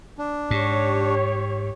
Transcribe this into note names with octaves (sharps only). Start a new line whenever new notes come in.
D4
G#2 G4 C#5